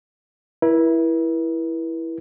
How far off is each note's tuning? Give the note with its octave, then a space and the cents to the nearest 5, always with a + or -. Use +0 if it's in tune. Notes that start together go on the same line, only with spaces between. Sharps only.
E4 +0 B4 -45